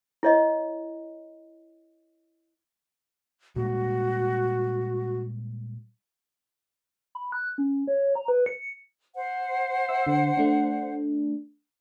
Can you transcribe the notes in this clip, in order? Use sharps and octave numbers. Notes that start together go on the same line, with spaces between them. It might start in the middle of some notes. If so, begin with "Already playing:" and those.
E4 C#5 D#5
A#2 G3 G#3 F#4
B5
F#6
C#4
C#5
A#5
B4
C#7
C5 F#5
E5 E6
D3
A3 D4